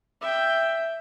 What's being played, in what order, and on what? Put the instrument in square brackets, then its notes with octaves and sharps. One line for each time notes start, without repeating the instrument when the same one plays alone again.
[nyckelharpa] E5 G5